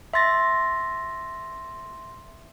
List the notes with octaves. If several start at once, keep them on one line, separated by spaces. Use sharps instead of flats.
E5 C6 A6 A#6